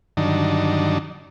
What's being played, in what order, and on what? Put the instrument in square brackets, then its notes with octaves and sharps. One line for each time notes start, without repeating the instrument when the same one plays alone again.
[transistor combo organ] G2 D3 D#3 F#3 D4 D#4